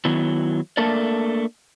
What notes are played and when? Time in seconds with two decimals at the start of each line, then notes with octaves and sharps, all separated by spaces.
0.05 D#3 F#3 B3 E4
0.77 A3 A#3 D4 A4 A#4 D5